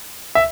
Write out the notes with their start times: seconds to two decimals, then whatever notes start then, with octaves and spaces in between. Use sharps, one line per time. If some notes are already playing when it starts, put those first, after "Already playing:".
0.35 E5